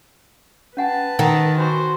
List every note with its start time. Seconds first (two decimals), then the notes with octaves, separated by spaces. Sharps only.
0.77 C#4 B4 F#5 G#5 A5
1.19 D#3 A#4 F#5 G5
1.58 D#4 F#4 C5 G#5 B5